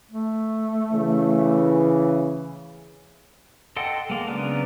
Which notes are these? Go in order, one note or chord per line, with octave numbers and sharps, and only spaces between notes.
A3
C#3 E3
A4 D#5 F#5 G5 C6
G#3 A#3
C#3 F#3 B3 D4 A#4